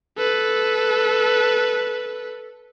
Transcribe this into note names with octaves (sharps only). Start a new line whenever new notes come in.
A4 B4